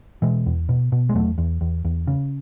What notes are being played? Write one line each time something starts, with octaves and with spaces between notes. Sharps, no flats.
B2 E3 G#3
E2
B2
B2
G#3
E2 F#3 A3
E2
E2
E2
C#3